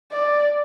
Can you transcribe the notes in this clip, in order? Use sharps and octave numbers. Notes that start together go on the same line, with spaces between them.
D5